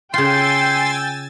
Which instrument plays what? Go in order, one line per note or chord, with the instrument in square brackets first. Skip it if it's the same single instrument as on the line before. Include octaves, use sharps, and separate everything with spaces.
[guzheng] C#3 F4 [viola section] G5 [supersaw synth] G#5 E6 A6 [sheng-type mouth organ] C6